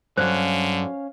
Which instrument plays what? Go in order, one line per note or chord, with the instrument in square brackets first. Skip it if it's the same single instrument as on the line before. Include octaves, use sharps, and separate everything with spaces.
[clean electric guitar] G2 F#3 [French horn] D3 [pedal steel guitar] C#4 F5 G#5 [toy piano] C5